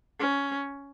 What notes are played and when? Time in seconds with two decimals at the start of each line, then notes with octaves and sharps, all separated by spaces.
0.20 C#4